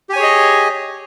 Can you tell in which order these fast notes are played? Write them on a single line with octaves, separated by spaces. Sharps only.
G4 G#5 C#5 G#4 D#5